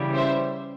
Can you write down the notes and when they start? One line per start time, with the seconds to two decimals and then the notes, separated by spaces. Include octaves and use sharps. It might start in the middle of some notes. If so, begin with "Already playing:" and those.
Already playing: C#3 E3 G3
0.15 C5 E5